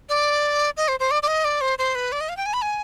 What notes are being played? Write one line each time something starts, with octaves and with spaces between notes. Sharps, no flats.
D5
D#5
C5
C5
D5
D5
D#5
D5
C5
C5
B4
D5
D#5
F5
G5
G#5
B5
G#5